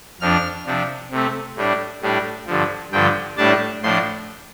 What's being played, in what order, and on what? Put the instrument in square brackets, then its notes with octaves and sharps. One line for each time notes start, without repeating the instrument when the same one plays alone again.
[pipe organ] F2 F3 D4 F6
C3 F3 D4
C3 A3 C4
A2 G3 D4
A2 G3 D4
G2 D3 F3
G2 D3 F3 G5
A2 G3 D4 A5
A2 F3 D4 C6